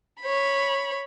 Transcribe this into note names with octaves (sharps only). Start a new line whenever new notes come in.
C#5 B5